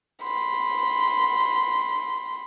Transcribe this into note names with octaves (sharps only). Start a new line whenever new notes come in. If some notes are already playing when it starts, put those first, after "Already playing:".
B5 C6